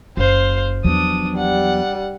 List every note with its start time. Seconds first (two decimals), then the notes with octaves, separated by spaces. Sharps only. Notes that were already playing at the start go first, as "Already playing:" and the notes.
0.17 F#1 C5 F5
0.84 E2 F3 F#3 B3 D4 D#6
1.37 G3 F#5